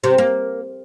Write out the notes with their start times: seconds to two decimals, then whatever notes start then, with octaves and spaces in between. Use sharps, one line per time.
0.04 C3
0.18 A#3